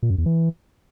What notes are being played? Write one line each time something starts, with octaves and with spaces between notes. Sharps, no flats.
A#2
F#2
E2
E3